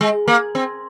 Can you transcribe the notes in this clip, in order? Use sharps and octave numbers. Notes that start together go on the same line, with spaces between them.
G#3
A#3
C4